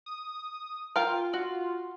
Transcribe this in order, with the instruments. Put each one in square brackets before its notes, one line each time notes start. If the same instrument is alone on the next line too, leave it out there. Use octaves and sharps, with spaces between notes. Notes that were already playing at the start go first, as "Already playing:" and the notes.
[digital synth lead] D#6
[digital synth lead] F4 [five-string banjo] A#4 F5 G5
[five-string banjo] F#4